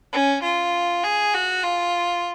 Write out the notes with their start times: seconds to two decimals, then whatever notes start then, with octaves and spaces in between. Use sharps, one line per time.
0.13 C#4
0.43 F4
1.04 G#4
1.34 F#4
1.63 F4